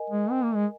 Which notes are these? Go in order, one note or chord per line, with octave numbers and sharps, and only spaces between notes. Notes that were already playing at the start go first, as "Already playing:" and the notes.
Already playing: A#4 D#5 G#5
G#3
C4
A#3
G#3